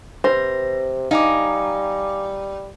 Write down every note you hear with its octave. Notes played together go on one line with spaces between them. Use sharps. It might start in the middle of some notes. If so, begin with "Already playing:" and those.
C3 B4 C5 A#6
G3 D#4 F5 G#5 D6